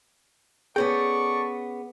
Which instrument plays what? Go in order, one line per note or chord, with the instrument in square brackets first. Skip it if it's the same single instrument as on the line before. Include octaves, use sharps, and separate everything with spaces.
[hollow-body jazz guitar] B3 C#4 G5 [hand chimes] G#4 [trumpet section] A4 D5 C#6